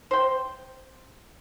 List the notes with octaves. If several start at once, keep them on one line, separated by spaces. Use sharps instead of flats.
C5 G5